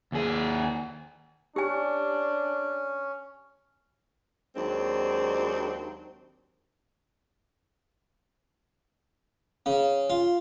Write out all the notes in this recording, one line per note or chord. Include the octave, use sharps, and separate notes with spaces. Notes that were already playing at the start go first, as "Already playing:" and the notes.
D#2 G#4
C#4 D4 G4 G#5
D#2 F#3 G#3 C4 D4
C#3
F4